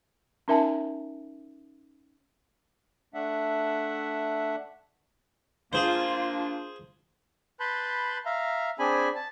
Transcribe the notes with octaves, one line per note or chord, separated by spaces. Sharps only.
C#4 D#4 A#4 E5 G#5 A5
A3 D4 E5 F#5
A#3 D4 F4 G#4 C5
B4 A5 B5 C6 G6
E5 F5 A#5
C4 D4 G#4 G#5 B5
A5